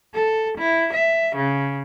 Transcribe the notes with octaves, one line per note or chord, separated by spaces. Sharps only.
A4
E4
E5
C#3